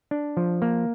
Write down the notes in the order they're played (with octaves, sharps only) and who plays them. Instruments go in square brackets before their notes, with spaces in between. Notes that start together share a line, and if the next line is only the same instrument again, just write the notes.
[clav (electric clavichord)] D4
F3
A#3